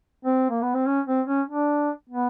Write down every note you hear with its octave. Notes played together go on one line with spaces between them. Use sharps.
C4
A#3
B3
C4
C#4
C4
C#4
D4
B3